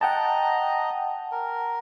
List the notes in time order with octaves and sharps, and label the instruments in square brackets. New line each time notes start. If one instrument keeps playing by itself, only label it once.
[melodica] D#5 A#5 [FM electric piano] F#5 G5 A5
[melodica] A#4